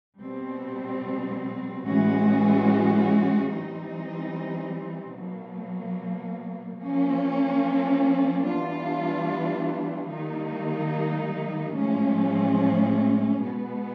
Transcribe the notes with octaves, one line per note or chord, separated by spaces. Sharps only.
B2 G3 C4
A2 E3 G#3 C#4 F#4
E3 G3 C4 D#4
B2 F#3 A#3
F3 A#3 C#4
E3 G3 B3 D4 F4
D#3 G3 A#3 D#4
A2 F3 G#3 C#4
B2 G#3 B3